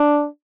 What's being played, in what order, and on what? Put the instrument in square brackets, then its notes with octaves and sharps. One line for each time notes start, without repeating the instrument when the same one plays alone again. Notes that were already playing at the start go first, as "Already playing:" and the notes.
Already playing: [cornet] D4